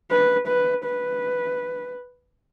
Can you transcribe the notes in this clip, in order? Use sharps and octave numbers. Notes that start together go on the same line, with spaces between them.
B4
B4
B4